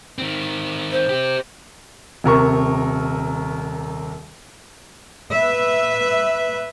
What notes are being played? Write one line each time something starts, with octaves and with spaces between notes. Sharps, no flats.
D#3 C4
C5
C4 G4
D#1 C3 A#4 C#6
B4 E5